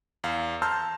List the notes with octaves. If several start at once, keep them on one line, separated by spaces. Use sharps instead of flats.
E2 F5
A5 A#5 C6 E6 F6 G6